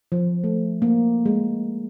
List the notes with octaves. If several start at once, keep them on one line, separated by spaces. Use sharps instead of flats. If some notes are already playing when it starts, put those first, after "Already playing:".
F3
A3
A#3
G#3